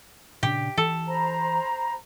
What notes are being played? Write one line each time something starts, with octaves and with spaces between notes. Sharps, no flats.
A#2 C#3 D4 G4
E3 A4
C5 A#5 B5